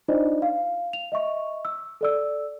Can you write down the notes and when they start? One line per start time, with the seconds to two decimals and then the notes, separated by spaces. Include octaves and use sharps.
0.08 D4 D#4 F4 C5 D5 D#5
0.42 F5
0.93 F7
1.12 D#5 E5 C#6
1.65 E6
2.01 A4 D5 E6